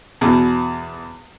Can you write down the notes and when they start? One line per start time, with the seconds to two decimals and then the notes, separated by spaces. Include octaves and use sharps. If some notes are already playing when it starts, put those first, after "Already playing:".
0.21 E2 B2